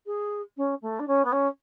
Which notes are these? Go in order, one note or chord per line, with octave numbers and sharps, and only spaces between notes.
G#4
C#4
A3
D4
C#4
B3
C#4